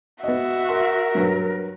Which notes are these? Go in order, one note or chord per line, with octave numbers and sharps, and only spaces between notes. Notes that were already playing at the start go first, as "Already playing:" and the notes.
B3 F#4 D#5 E5
A#4 C6
G2 F#3 B4